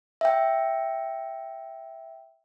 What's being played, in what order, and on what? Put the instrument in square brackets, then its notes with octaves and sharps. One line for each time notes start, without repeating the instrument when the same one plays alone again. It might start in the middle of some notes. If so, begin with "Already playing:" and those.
[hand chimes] E5 G5